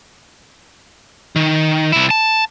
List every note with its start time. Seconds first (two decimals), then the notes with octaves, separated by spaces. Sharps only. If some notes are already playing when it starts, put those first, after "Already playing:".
1.36 D#3
1.92 C2 E4
2.11 A5